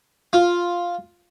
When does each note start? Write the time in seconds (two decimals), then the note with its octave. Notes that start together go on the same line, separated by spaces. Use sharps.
0.33 F4